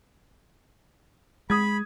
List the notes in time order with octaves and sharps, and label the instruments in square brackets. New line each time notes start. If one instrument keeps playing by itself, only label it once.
[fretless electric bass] G#3 [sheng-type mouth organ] B5 [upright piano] D#6 G#6